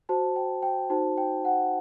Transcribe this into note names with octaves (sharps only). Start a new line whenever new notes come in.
F#4 C5 A5
G5
G5
D#4 F#4 C5 A5
G5
F#5